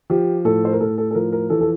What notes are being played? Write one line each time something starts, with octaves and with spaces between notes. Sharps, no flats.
F3 G4
A2 A4
C5
A#4
A2 A4
A4
A4
F3 A#4
A#4
E3 A4
A4